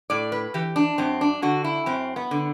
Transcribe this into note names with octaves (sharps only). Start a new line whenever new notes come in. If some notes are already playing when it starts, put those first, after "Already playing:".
A2 D5
B4
E3 G4
D4
F#2 C4
D4
D3 F#4
E4
F#2 C4
B3
D3